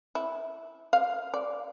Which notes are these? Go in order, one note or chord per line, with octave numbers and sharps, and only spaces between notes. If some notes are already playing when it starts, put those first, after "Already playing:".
E4
F5
D5